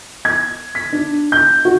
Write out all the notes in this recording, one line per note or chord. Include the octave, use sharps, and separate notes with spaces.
G#6
B6
D4
G6
F#4